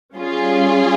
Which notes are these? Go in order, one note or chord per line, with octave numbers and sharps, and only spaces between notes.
G3 C#4 F4 G#4